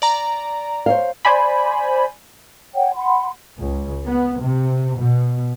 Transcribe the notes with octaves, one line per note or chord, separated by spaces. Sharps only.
D5 A#5
C5 C#5 F5
C5 D5 G#5 B5
C#5 F#5 G5
F#5 B5 C6
C#2
B3
C3
B2